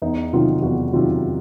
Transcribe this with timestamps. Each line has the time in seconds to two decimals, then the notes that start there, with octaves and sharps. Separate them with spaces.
0.02 E2 D#4
0.33 C3 D#3 F#3 F4
0.62 E2 F#4
0.93 C3 D#3 F#3 F4